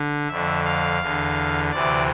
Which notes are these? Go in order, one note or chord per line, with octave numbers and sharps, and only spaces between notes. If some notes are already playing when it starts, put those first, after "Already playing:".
Already playing: D3
F2 D3 E5
F5
E2 D3
D2 C3 E3 D5